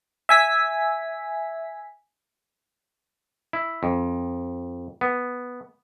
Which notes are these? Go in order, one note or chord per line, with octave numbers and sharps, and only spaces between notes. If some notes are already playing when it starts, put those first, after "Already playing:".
E5 G#5 B6
E4
F2
B3